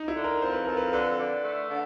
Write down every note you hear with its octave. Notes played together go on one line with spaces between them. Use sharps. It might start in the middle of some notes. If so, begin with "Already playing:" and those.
Already playing: D#4
E4
D3
A#4
F2 C5
B4
F2 A#4
B4
D3 B4
D3
A3
D3